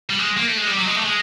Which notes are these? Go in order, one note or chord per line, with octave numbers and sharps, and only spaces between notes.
G3
G#3
A#3
A3
G#3
G3
F#3
G#3
A3
G#3